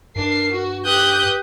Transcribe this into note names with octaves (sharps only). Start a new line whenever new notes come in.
G2 D4 A#4 C7
F#4
G4 B4 D#6 F#6 G6